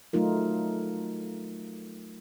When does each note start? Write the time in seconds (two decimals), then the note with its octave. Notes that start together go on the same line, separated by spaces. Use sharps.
0.13 F#3 A3 D#4 F4 A#4